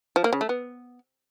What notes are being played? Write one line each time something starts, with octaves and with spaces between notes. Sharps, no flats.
F3
A#3
C#3
A3
B3